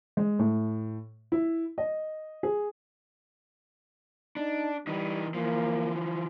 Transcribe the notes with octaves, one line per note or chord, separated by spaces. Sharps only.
G#3
A2
E4
D#5
G#4
D4 D#4
E3 G3 D#4
E3 F3 A#3